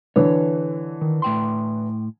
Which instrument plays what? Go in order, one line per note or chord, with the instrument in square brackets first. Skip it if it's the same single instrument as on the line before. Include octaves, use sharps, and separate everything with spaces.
[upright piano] D3 E3 [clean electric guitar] C#5
[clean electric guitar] D#3
A2 G5 C6